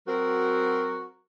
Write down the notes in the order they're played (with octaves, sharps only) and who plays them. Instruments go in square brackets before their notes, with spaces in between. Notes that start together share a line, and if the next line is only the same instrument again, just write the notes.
[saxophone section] F#3 C4 F#4 A#4